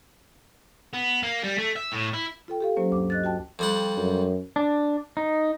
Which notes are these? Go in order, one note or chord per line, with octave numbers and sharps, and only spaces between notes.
B3
A#3
G3
A3
E5
A2
E4
F4 A4 G5
G4 A4 F5
F#3 A#3 C#4 C5
D2 G2 D6
D#5 F#6 A6
F#4 G5 A5
F2 G3 F#5
F#2
D4
D#4